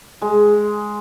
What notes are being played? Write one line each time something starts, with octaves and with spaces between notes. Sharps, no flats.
G#3